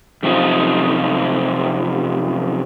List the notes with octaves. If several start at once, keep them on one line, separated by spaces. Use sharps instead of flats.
F#2 C3 F3 D#4